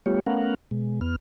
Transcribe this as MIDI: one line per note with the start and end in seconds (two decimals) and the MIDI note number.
0.06 0.20 55
0.06 0.20 57
0.06 0.20 59
0.06 0.20 65
0.06 0.20 67
0.06 0.20 73
0.26 0.54 57
0.26 0.54 59
0.26 0.54 61
0.26 0.54 70
0.26 0.54 77
0.26 0.54 78
0.71 1.00 47
0.71 1.00 56
1.01 1.16 40
1.01 1.16 59
1.01 1.16 89